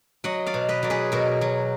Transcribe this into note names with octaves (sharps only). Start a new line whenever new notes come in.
F#3 D#5 F#5
D5 F5
B2
B4 D#5
F#3 D5
G#4 B4
B2 F#4 A#4
F#3